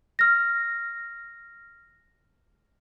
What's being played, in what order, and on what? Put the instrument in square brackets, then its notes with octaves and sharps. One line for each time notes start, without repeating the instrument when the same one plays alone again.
[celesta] F6 A#6